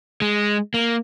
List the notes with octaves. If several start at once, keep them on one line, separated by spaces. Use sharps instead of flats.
G#3
A#3